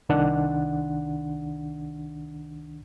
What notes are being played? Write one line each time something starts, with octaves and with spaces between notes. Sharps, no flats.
C2 D#3 D4 F#5